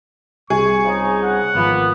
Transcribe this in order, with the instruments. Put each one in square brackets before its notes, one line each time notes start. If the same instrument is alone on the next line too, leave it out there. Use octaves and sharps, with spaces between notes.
[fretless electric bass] C2 [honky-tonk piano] G#4 [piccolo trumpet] C#6
[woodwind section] C#3 F3 D#4
[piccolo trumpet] F#5
[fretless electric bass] G#1 F3 [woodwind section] A#3 B3